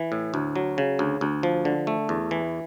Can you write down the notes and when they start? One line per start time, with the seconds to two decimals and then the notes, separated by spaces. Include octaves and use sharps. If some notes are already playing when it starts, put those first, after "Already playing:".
Already playing: E3
0.12 A2
0.34 D2
0.56 F#3
0.78 C#3
0.99 D2
1.21 D2
1.43 F3
1.65 D3
1.87 A3
2.09 E2
2.31 E3